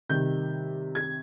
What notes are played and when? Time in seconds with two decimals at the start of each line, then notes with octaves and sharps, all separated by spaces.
0.09 C3 D#3 G3 G6
0.95 G#6